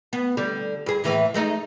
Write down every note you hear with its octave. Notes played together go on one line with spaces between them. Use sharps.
B3
D3 G3
G2 G#4
D#2 A2 E3
G#3 A3 D#4